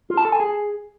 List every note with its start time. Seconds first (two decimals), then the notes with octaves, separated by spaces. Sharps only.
0.10 F4
0.17 A5
0.25 A4
0.32 G#5
0.40 G#4